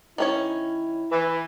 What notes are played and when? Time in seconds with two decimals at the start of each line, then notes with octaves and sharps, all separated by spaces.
0.18 D#3 C#4 E4 C#5
1.12 E3